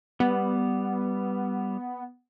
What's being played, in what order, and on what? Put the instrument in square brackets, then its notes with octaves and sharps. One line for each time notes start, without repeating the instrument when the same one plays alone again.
[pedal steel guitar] G3 [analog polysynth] B3